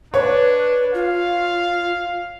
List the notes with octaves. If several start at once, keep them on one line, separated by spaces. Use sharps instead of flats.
D4 B4 C#5
F4 F5